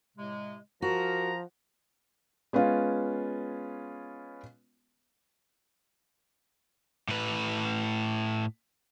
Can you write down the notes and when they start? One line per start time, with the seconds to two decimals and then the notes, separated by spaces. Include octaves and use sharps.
0.17 A2 C3 G#3
0.82 F3 F#4 A#4 A#5
2.53 G#3 B3 C#4 F4
7.09 A2 B4